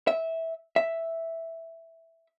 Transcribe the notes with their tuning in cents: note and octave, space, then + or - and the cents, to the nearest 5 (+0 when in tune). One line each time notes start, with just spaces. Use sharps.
E5 -15
E5 +0